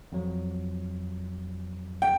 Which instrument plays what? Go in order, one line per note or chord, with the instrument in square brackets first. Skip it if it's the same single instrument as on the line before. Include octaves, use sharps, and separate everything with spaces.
[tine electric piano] F2 F#3
[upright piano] G5